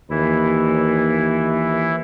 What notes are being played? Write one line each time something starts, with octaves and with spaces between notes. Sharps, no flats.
D#2 E3 E4